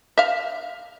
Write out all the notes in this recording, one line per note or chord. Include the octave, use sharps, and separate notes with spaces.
E5 F5